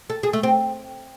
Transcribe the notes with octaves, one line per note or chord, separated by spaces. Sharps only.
A4
G#4
A3
C4